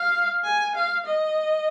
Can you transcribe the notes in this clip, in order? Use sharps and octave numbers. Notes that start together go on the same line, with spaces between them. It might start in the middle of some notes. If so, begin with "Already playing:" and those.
Already playing: F5
G#5
F5
D#5